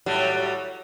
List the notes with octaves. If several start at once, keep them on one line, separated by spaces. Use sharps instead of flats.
A2 F#3 G3